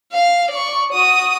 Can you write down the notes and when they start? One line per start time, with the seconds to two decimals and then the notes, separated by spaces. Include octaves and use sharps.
0.13 F5
0.51 D5 C#6
0.92 F#4 D#6